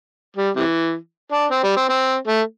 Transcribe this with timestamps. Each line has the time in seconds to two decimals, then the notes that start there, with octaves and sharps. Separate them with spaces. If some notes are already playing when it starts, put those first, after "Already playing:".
0.37 G3
0.56 C3 E3
1.32 D4
1.51 C4
1.63 G3
1.77 C4
1.89 C4
2.28 A3